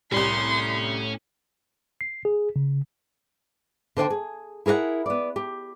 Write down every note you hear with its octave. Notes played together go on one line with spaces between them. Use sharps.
C2 A2 G3 C#4 C6
C7
G#4
C#3
D3 C5 D5 G5
G#4
E4 G#4 A#4 D5 F#5
B3 D5
G4